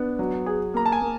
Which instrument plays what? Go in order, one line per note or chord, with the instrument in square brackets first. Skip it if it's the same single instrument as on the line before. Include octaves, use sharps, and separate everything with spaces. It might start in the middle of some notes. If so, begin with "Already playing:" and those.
Already playing: [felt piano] B3 D4
F#3
G#4
[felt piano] A#3 [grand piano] A#5
[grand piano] A5
G#5
[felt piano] A#3